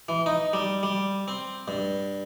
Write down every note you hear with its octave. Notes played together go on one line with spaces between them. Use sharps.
E3
D#4
G3
G3
C4
G2